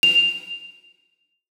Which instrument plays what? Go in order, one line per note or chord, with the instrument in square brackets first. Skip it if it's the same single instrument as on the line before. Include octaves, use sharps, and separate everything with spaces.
[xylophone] F7